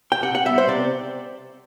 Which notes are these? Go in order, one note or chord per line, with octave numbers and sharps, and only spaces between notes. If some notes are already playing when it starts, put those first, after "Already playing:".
G5
C3 F#5
F#5
G3 B3 E5
C5
C3 D5